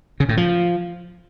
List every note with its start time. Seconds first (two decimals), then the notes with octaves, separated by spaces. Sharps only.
0.20 C#3
0.29 A2
0.37 F3